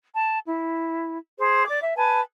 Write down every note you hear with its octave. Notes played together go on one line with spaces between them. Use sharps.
A5
E4
G#4 C5
D5 D6
E5
B4 G#5 A5